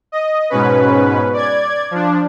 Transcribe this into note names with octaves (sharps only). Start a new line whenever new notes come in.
D#5
G#2 B2 C#4 B4
D5 G#6
F3 D4